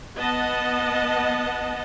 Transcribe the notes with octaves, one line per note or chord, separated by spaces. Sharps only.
B3 D#5 F#5 A5